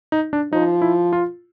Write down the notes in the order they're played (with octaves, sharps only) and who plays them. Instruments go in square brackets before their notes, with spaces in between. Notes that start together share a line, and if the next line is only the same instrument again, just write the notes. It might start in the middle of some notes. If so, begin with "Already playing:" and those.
[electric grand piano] D#4
D4
[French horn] F3 [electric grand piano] D#4
[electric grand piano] E4
F4